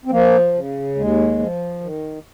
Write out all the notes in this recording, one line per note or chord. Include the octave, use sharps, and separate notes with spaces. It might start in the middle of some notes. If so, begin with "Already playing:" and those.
C4
F3 A#3
C#3
D#2 G#3
F3
D#3